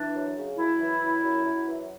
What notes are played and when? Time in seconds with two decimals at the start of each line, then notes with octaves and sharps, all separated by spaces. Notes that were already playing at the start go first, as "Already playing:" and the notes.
Already playing: E3 D4
0.15 F#2
0.36 C#3
0.57 F#2 E4
0.79 E3
1.01 F#2
1.22 F#2
1.44 F#2
1.66 E3